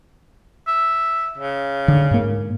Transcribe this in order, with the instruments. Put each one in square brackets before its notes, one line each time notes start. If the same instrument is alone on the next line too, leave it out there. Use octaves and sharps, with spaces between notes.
[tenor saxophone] E5
C#3
[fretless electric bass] D3
G#2 A#3